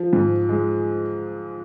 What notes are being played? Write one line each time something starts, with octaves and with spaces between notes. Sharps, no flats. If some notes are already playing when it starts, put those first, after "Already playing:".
Already playing: F3
G#2
G#3